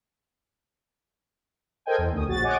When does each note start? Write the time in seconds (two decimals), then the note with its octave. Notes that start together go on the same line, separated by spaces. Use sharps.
1.86 A4 A#4 C5 D#5 G5 G#5
1.98 E2
2.13 D2 C#4 D#6
2.27 A#1 F#4 A6
2.43 C#5 D#5 F#5 G#5 D6